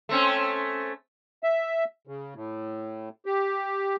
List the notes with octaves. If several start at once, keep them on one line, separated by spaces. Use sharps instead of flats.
A3 C4 C#4
E5
C#3
A2
G4